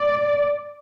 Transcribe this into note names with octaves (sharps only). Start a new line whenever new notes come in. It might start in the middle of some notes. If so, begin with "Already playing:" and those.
Already playing: D5